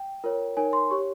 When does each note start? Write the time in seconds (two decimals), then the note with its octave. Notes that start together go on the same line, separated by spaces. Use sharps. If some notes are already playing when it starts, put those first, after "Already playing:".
Already playing: G5
0.24 F4 A#4 C#5
0.57 D#4 A#4 C#5 G#5
0.73 C6
0.91 G4 C#5 C#6